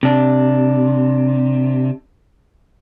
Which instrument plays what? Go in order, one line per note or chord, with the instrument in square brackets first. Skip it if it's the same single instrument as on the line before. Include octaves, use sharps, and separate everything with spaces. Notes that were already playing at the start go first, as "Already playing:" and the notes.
[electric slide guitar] C3 D4